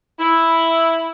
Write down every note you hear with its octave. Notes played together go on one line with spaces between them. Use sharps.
E4